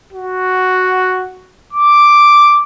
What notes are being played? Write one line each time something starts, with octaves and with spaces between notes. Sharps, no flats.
F#4
D6